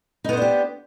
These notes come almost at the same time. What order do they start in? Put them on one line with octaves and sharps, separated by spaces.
D#4 B3 C5 D4 G4